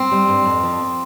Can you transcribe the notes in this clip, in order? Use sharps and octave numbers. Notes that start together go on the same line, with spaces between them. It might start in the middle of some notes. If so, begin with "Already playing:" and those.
Already playing: C4
G3
G2
F2
F3